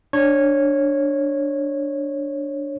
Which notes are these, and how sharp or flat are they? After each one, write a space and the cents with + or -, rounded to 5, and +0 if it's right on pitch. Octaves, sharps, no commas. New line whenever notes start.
D4 +0 C#5 -15